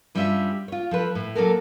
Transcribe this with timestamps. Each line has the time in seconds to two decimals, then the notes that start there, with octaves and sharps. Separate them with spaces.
0.15 G2 G3 C#4 E4 F4 E5
0.68 F4 C#5
0.91 F3 A4 B4
1.15 A2
1.36 F#3 A#3 C#4 A4 A#4